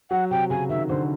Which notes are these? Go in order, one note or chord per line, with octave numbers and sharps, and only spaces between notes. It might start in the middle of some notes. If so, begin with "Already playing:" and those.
F#3 F#5
C3 G5
C#3 G#5
D#3 E5
D3 C5